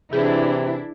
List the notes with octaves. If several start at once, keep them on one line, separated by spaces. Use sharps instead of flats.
C3 E3 D4 E4 G#4